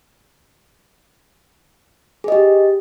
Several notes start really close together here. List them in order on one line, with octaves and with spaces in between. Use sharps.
G#4 D#5 G4